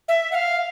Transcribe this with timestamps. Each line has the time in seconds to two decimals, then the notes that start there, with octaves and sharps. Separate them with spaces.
0.08 E5
0.32 F#5
0.35 F5